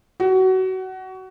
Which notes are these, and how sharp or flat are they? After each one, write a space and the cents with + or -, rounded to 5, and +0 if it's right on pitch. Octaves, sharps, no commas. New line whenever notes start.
F#4 +25